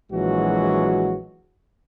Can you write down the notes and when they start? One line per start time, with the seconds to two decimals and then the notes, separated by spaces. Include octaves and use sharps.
0.12 A#1 E3 F#3 G#3 F#4